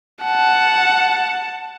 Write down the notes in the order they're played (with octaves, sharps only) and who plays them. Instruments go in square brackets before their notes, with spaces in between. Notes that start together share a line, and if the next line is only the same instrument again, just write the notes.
[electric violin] F#5 [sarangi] A5